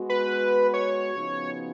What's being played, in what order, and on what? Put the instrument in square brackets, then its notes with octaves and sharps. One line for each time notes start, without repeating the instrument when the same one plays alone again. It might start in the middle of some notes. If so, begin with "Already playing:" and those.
Already playing: [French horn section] G#3 B3 F#4
[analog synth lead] B4
C#5
[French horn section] C#3 F3 B3 D#4 F#4